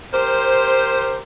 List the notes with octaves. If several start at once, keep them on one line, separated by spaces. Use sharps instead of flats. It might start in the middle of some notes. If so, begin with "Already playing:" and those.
G4 A#4 C5